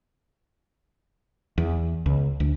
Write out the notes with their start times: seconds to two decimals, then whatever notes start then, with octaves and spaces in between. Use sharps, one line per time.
1.58 E2
2.06 C#2
2.40 D2